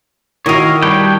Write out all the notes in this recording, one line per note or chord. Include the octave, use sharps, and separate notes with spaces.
D#3 E4 F#4 A#4 C#5 D#5 F5
G3 D4 B4 C#5 G5